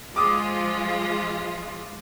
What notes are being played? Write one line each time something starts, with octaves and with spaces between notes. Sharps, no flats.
F3 G#3 F4 D6 D#6